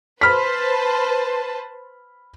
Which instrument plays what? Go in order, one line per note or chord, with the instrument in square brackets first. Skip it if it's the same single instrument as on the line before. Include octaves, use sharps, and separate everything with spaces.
[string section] B4 C5 A5 [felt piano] B5 F6 B6